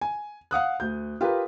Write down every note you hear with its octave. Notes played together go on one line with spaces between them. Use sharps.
G#5
F5 F#5 D#6 F#6
D2 G6
F4 G4 A#4 B4